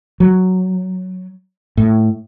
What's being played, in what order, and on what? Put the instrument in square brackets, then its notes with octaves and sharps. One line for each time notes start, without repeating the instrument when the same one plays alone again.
[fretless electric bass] F#3
A2